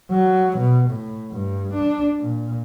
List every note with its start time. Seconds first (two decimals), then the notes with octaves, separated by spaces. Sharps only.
0.11 F#3
0.58 B2
0.90 A2
1.31 G2
1.74 D4
2.20 A#2